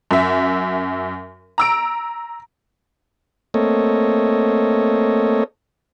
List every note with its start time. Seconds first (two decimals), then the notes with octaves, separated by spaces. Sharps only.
0.11 F#2 E5
1.58 A#5 E6 D7
3.54 A3 A#3 C4 A4 C#5 D#5